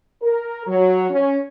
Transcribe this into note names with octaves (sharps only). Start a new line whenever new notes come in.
A#4
F#3
C#4